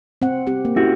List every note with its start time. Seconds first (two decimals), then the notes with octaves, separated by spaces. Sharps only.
0.22 C4 F#5
0.47 C4 G4
0.65 A#3
0.76 C#4 E4 F#4 G4